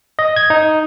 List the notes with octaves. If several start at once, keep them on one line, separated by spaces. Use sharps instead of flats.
D#5
G#6
D#4